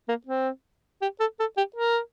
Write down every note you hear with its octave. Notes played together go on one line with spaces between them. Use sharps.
A#3
C4
G4
A4
A4
G4
A#4